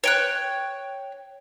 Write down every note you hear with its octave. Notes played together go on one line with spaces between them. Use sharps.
C#5 G5 F#6